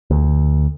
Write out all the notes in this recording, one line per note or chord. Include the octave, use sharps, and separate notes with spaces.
D2